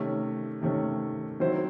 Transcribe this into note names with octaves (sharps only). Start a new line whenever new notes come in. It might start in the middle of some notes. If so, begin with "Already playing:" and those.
Already playing: C3 D#3 A3 C#4
C3 D#3 A3 C#4
D#3 F#3 C4 E4 C5